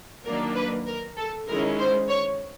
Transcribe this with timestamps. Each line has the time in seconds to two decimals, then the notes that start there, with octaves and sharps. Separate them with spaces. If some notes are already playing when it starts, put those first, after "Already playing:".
0.25 D#3 F#3 A#3 D4 A#4
0.55 B4
0.87 A#4
1.17 A4
1.48 D#3 G#3 C#4 E4 A#4
1.79 C5
2.09 C#5